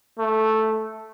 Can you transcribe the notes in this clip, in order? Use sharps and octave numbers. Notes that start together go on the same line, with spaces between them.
A3